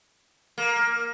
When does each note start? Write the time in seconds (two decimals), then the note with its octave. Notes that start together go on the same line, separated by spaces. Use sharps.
0.58 A#3